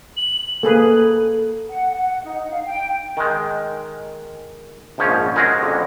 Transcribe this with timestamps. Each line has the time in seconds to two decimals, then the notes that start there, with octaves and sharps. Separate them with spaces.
0.17 F#7
0.63 A#3 G#4 A4 B4
1.69 F#5
1.92 F#5
2.24 D#4
2.51 F5
2.65 G5
3.17 D#3 G#3
4.98 A#1 G#2 F3 C#4 C#5
5.36 G#3 C4 C#4 F#4 G#4 A#4
5.63 F2 D3